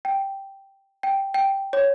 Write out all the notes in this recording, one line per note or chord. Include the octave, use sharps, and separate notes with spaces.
G5
G5
G5
C#5